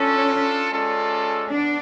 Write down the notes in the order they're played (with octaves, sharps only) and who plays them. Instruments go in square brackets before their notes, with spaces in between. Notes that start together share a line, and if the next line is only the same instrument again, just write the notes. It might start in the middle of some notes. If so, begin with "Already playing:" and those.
Already playing: [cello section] C#4 [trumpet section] D4 F4 A4
[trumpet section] G#3 C#4 F4 A4 D5
[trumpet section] B3 [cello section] D4